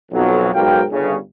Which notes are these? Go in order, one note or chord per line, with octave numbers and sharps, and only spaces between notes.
B1 F2 F#3
B1 G#2 F#4 A#4 F5 G5
G1 C#3